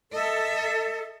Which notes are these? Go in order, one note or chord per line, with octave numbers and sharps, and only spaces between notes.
A4 D#5 E5